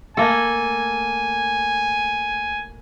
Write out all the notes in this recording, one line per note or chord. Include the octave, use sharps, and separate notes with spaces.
A3 A#3 A4 G#5